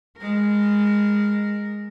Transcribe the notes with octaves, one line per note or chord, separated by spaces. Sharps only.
G#3 A#4